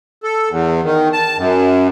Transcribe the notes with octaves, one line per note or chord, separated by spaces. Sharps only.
A4
E2
D#3
A5
F#2